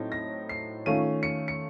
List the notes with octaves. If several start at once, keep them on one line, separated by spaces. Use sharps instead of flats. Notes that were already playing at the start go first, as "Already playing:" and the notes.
Already playing: A2 F#3 C4 D#4
A#6
C7
D#3 A3 C#4 F4 D#7
C#7
C#7